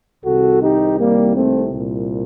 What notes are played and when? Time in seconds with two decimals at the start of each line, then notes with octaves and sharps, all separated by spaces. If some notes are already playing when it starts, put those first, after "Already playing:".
0.24 C2 C3 D#3 F#4 A4
0.61 D#4 G4
0.98 G3 A#3
1.34 A3 C4
1.71 C2 A#2